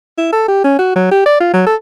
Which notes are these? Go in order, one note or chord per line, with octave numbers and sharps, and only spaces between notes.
E4
A4
G4
C#4
F#4
F#3
G4
D5
F4
F#3
A4